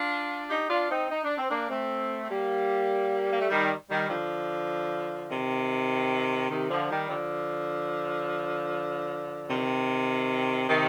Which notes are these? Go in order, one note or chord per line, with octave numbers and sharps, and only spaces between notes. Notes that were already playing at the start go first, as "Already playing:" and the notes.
Already playing: D4 F4
D#4 G4
D4 F4
C4 D#4
D#4
D4
C4
A#3 D4
A3 C4
C4
G3 A#3
A#3
A3
D#3 G3
D#3 G3
D3 F3
C3 D#3
C3 D#3
D3 F3
D#3 G3
D3 F3
C3 D#3
C3 D#3